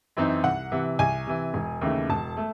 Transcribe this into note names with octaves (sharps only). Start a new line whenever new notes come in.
F#2 E3 C4 D#4
C2 F#5
C3 E3
C2 G#5
C3 E3
E1
D#2 C#3 E3 A3
E1 A5
A3